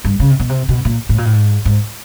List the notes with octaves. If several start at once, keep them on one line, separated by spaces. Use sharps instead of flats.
G2
C#3
C3
B2
C3
B2
A#2
A2
A#2
A2
G#2
G#2